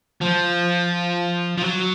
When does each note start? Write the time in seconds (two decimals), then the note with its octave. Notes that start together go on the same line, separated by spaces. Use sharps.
0.21 F3
1.58 F3
1.64 F#3